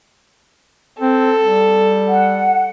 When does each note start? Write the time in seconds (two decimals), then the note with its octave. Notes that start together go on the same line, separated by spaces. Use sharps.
1.00 C4 A4
1.42 G3
2.09 F#5